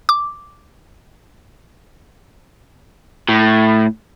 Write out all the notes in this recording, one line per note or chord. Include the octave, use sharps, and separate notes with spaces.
D6
A2